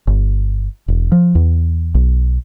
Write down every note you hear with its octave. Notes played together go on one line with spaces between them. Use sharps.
G1
E1
F3
E2
B1